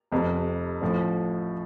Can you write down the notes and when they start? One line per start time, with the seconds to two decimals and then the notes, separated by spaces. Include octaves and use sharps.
0.12 F1 F2 C3
0.81 A1 A2 F3